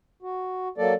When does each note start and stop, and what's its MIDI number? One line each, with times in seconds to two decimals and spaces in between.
0.23 0.68 66
0.78 0.94 54
0.78 0.94 58
0.78 0.94 69
0.78 0.94 74